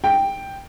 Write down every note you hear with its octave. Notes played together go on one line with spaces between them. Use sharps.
G5